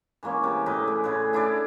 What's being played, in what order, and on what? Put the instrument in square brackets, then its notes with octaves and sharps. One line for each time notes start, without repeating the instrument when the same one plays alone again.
[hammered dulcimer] E3 G#3 A#3 C#4
C3
A2 B4 D#5 D6
G#3
A2 C#3 G#4 B4
D4 E4 G#4 D5